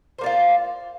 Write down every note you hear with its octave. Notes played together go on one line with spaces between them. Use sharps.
A#3 F4 C5 D5